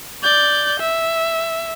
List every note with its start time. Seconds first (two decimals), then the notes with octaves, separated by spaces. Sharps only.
0.23 D5 G6
0.80 E5